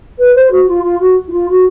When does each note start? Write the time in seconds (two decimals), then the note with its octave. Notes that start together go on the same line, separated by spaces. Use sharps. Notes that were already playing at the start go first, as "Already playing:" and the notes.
0.18 B4
0.35 C5
0.50 F#4
0.67 F4
0.83 F4
0.99 F#4
1.27 E4
1.31 F4
1.49 F#4